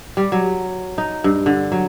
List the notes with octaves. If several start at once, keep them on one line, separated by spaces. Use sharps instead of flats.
G3
F#3
D#4
G2
D3
F#3